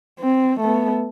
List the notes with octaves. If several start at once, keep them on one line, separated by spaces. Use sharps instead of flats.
C4
A3 B3